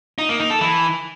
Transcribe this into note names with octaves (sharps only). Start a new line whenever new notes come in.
D#4
A#3
D#4
A4
E3